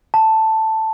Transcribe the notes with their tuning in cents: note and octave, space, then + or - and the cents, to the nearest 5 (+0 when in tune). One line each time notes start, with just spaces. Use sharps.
A5 +5